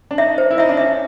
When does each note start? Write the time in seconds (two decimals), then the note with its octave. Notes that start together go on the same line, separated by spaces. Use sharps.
0.11 D4
0.18 D#4 E5
0.38 C5
0.51 E4
0.58 D#4 E5
0.69 D4
0.77 C#4 E5